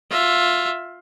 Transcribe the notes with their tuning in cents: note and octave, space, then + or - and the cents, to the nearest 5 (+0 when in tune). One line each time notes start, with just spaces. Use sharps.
F4 +15 E5 +10